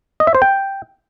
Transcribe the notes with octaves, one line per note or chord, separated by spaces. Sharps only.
D#5
E5
C5
G5